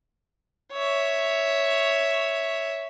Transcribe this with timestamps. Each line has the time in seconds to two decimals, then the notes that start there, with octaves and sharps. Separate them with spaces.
0.73 C#5 E5